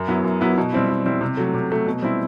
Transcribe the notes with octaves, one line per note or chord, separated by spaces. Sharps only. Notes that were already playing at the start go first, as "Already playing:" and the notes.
Already playing: F#2
F#3 B3 E4
F#2
F#3 B3 E4
B2
G3 C4 E4
B2
G3 C4 E4
C3
F#3 A3
C3
F#3 A3
B2
G3 C4 E4